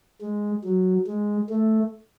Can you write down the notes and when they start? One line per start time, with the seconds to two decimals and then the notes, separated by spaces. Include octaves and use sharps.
0.21 G#3
0.64 F#3
1.07 G#3
1.50 A3